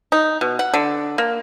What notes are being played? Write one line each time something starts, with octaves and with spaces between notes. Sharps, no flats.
D#4
B2
F#5
D3
A#3